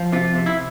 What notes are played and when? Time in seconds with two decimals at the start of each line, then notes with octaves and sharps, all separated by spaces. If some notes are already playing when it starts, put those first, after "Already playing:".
Already playing: F3
0.12 C3 F4
0.35 C3
0.46 E4